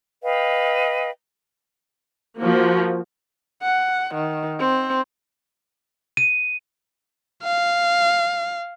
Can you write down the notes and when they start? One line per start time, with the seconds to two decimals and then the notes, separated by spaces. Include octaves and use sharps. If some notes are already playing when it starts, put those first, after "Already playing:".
0.23 B4 D#5 F5 G5
2.39 F3 A#3 F#4
3.62 F#5
4.15 D#3
4.60 C4
6.17 D#7
7.44 F5